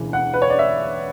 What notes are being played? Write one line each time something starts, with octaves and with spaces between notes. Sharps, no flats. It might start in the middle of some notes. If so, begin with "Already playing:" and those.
Already playing: E1 D2 C#3 E3
F#5
B4
C#5
D5
E5